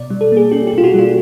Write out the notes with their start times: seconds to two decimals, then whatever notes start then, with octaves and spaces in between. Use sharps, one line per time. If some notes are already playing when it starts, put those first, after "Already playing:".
Already playing: B2 D5
0.10 G3
0.21 A4
0.32 A#3 G#4
0.52 C#4 G4
0.67 G4
0.73 B2 F4
0.84 F#4
0.94 G3 F4